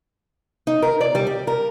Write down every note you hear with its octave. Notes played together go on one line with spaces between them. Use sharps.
D#4
A#4
D5
G3
G4
A#4